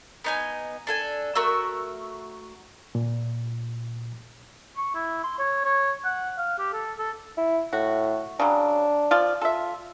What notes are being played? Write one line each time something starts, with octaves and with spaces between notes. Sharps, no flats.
B3 D#4 G#5
D4 A4 G#5
A3 F#4 A#4 E6
A#2
C#6
E4
C6
C#5
C#5
F#5
F5
G4
A4
A4
E4
A2 F#4
C#3 F#3 D4
F3 F4 D5
F4 A4 E5